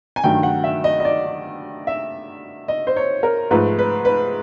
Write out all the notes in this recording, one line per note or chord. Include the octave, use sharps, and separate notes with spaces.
G#5
G2 D#3 F#3 A3 G5
F#5
E5
D#5
D#5
D5
E5
D#5
C5
C#5
A#4
G#2 F3 A3 B4
B4
B4